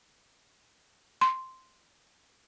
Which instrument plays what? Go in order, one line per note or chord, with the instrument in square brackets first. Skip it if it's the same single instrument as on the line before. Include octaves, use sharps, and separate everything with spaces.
[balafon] C6